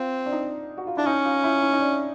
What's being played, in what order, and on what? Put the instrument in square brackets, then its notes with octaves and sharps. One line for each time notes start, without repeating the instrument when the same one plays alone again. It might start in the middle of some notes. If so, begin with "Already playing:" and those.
Already playing: [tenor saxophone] C4 [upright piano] F4
[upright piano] D4
D#4
F#4
F4
[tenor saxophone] D4 [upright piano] E4
[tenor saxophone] C#4 [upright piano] D#4
[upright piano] F4
E4
D#4
D#4
D4